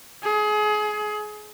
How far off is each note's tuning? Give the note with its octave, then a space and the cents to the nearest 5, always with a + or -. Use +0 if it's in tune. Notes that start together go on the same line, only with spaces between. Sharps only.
G#4 +25